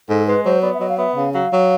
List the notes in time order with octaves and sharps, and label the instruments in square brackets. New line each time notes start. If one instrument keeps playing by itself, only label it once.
[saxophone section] G#2 [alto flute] A4
[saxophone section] G#3 [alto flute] B4
[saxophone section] F#3 [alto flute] C5
[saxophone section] B3 [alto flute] D5
[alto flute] E5
[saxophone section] F#3 [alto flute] D#5
[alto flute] F5
[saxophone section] B3 [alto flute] E5
[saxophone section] C#3 [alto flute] F5
[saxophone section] F#3 [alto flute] F5
[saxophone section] F#3